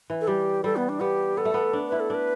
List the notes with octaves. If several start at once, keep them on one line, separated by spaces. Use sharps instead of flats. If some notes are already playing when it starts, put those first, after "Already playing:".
E3
A4
G3 G4
G3 A4
B3
D4
B3 G4
B3 A4
A3
B3
D4
E4 B4
A4
D4 B4